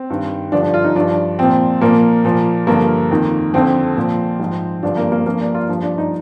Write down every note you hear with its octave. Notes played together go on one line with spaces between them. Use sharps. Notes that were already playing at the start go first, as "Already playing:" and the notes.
Already playing: C4
G2 D#3
G2 D3 F3 D4
D4
F4
D#4
G2 F3 D4
A#2 F3 C4
A#2 F3 A#3
A#2 F3
G2 D3 F3 A#3
F2 D#3
F2 D3 F3 C4
A#2 F3
G#2 F3
G2 D3 F3 D4
A#3
A#3
G2 F3 A#3
D4
F4
G2 F3
D4
D#4